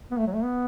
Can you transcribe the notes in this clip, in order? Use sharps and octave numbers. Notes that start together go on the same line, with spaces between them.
B3
A3
F#3
A3
B3